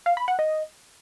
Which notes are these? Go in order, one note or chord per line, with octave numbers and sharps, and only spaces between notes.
F5
B5
F#5
D#5